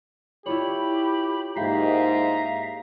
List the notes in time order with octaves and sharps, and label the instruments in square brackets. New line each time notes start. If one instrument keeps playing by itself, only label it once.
[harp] E4 F4 C#5 [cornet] G4 [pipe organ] B5
[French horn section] G#2 [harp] A#3 G4 [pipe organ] E5 F5 [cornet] A#5